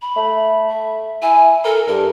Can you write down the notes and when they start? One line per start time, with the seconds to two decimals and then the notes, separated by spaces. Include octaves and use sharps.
0.02 B5
0.17 A3
0.69 E5
1.22 E4 G#5
1.65 A4 A#4
1.88 G2 A#4